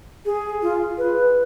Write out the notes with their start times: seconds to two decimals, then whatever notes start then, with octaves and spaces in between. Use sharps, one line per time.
0.25 G#4
0.62 F4
0.98 B4